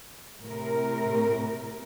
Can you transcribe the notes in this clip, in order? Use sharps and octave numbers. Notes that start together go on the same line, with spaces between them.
A2 C3 A#4